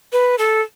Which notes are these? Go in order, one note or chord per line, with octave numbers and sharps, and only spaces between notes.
B4
A4